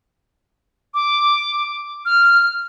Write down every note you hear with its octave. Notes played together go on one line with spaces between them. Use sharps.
D6
F6